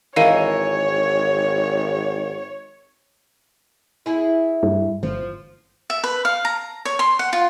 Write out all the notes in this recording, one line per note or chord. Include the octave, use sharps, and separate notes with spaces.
G#1 E3 A#4 C#5 D#5 F5 D#7
E4 G#4
G2
G1 F3
E5
B4
F5
A#5
C#5
C6
F#5
F4